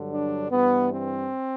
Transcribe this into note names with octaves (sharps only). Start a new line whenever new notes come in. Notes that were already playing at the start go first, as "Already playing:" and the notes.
Already playing: G2 D3 F#3
D4
G2 E3 B3
C4